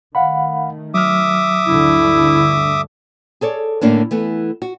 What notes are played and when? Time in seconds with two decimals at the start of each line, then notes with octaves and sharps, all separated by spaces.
0.15 D#3 A3 F5 F#5 B5
0.94 F#3 E5 D6 D#6 F6
1.66 D2 G2 D3 E4
3.41 G#4 A4 C#5 D5
3.81 A2 D3 A#3 C#4 D4
4.11 E3 A3 B3
4.62 F#4